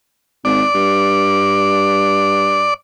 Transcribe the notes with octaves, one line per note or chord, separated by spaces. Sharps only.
G#1 D5
G2